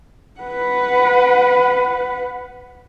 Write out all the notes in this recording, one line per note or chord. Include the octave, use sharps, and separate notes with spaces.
B4 F#5